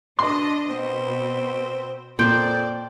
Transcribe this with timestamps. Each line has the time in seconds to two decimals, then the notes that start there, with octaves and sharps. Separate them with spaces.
0.19 B2 D4 D#5 C6
0.70 B2 C4
2.19 F2 A#2 C5 D5 G5